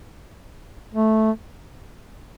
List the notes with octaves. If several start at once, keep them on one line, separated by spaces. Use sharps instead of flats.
A3